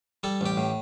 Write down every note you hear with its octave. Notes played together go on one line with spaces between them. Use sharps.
G3 A4
A1 G4
A2